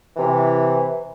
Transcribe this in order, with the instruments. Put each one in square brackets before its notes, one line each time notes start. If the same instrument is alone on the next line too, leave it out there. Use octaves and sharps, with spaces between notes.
[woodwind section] C3 E3